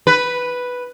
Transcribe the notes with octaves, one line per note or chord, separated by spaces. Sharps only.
B4